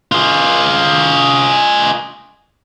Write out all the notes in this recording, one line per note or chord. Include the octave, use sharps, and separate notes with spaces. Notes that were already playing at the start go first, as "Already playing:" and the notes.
F4 G#4